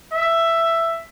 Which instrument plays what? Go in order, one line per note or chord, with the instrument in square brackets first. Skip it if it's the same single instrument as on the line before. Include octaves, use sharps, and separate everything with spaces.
[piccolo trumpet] E5